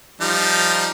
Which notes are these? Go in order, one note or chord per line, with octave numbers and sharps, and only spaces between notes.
F3 G3 D#4